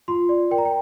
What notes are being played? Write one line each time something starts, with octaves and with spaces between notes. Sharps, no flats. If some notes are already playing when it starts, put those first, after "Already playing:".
F4 C6
D5
A#4 G5
A#5
G5